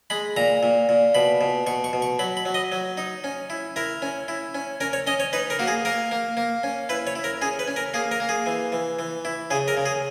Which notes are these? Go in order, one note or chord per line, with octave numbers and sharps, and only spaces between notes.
G#3 B5
A#2 A#5
A#2
A#2
B2 B5
B2
B2 C#6
C#6
B2
C#6
F#3 B5
B5
F#3
D#5
F#3
D#4
C#4
E4
E4 A#4
C#4
E4
C#4
C#4 A#4
C#5
C#4 D#5
C#5
D#4 B4
A#4
A#3 F#4
G#4
A#3 A#4
A#3
A#3
C#4
E4 B4
C#5
E4
A#4
C#4 G#4
B4
C#4
A#4
A#3 G#4
A#4
A#3
G#4
E3
E3
E3
E4
C#3 G#4
A#4
C#3
G#4